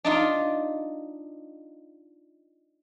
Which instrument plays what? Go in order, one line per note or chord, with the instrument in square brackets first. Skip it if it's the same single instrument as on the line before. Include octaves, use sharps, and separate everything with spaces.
[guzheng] D4 D#4 F4